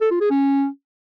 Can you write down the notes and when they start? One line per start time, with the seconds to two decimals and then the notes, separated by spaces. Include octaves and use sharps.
0.02 A4
0.11 F4
0.21 G#4
0.31 C#4